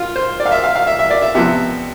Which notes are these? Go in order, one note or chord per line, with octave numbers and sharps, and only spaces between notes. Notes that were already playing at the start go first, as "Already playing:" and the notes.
Already playing: F4
C5
D5
F5
E5
F5
F5
E5
E5
D5
E5
C3 F3 B3 E5